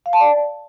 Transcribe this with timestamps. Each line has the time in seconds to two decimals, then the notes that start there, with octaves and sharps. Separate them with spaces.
0.06 F5
0.13 A5
0.20 D5